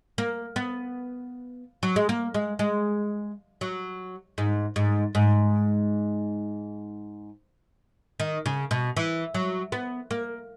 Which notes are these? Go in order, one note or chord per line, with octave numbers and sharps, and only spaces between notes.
A#3
B3
F#3
G#3
A#3
G#3
G#3
F#3
G#2
G#2
G#2
D#3
C#3
B2
E3
F#3
B3
A#3